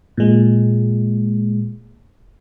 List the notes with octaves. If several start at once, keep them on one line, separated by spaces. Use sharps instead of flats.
A#2 G#3